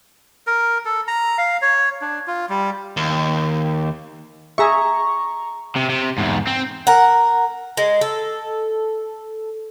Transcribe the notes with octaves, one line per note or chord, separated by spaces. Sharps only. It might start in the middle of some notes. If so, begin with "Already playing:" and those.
A#4
A4
A#5
F5
C#5
D4
F4
G3
D#2
G#4 E5 A#5 C#6
C3
C3
E2 G#2
C4
A#4 F#5
G#3
A4